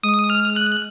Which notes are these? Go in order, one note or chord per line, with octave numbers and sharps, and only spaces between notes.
G#3 D#6
F6
F#6